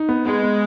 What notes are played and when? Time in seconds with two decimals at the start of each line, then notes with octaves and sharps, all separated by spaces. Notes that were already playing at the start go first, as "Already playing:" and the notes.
Already playing: D#4
0.09 B3
0.26 G#3 B3
0.43 B3